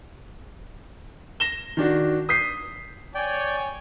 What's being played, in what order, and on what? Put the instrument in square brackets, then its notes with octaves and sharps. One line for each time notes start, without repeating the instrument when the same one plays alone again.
[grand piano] A#6 E7 G7
D#3 D4 F#4
D#6 G6 B6 C7
[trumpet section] C#5 G#5 [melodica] D5 G5